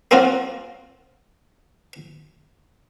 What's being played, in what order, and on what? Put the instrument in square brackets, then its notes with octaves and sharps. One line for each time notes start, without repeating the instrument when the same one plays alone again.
[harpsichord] A#3 C4 C#4 F4 F#4